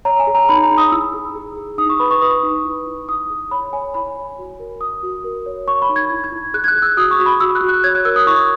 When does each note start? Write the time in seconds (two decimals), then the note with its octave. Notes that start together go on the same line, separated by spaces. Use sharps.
0.05 C#5 A#5
0.19 G#5
0.27 G#4
0.35 A#5
0.49 D#4 B5
0.63 A#5
0.71 D#4
0.78 D#6
0.92 E4 E6
1.14 G#4
1.35 G#4
1.57 G#4
1.78 D#4 D#6
1.90 C#6
2.00 B4 B5
2.11 C#6
2.22 B4 D#6
2.43 D#4
2.65 E4
2.87 E4
3.09 E4 D#6
3.30 G#4
3.51 C#5 B5
3.73 C#5 G#5
3.94 E4 B5
4.17 C#5
4.38 F#4
4.60 A#4
4.81 F#4 D#6
5.03 F#4
5.24 A#4
5.46 C#5
5.67 C#5 C#6
5.82 B5
5.89 D#4
5.96 G#6
6.11 E4
6.24 G#6
6.32 E4
6.54 G#4 F#6
6.64 G#6
6.68 F#6
6.76 G#4
6.82 E6
6.97 F#4 D#6
7.11 C#6
7.19 F#4
7.26 B5
7.40 F#4 E6
7.55 F#6
7.61 F#4
7.69 F#6
7.84 C#5 G#6
7.95 F#6
8.05 A#4 E6
8.16 D#6
8.27 E4 C#6